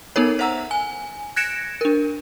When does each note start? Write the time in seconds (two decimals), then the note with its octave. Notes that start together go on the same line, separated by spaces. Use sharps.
0.16 B3 D#4 A4 A#4 C#5
0.39 C5 E5 F#5 A#5 E6
0.71 G#5
1.36 F#6 G#6 A#6 C#7 D7 E7
1.81 D4 A#4